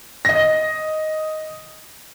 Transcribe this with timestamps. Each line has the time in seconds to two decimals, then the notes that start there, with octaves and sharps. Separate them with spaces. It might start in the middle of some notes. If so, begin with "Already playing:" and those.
0.25 D#5 A#6